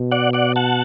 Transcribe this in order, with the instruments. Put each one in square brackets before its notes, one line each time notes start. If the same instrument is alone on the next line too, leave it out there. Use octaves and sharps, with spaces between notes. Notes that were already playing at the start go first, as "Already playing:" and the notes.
Already playing: [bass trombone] B2
[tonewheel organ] D5 F#5
D5 F#5
F#5 A5